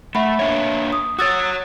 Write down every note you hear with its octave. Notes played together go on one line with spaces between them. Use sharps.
A3 E5 F#5 B5
A#3 D4 C#5 E5
D#6
F#4 C#5 D#6 E6 A6